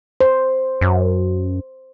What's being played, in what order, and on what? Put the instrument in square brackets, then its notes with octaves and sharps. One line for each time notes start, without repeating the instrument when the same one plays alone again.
[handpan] C5
[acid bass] F#2